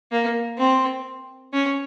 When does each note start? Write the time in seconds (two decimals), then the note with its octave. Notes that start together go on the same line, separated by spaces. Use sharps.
0.12 A#3
0.58 C4
1.53 C#4